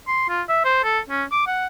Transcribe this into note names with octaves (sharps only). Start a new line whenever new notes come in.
C6
F4
E5
C5
A4
C#4
D6
F#5